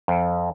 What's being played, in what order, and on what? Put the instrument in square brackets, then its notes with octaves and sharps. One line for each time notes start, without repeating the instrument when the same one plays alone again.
[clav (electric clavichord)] F2